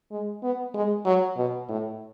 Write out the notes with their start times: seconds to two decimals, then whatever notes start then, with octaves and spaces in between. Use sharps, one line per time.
0.11 G#3
0.43 B3
0.74 G#3
1.05 F#3
1.37 B2
1.69 A2